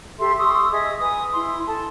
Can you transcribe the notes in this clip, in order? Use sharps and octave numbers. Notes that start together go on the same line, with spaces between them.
G4 A4 E5 C6
C6 C#6 D#6 E6
G#4 D#5 E5 D#6
B4 G#5 D#6
E4 C6
A4 A5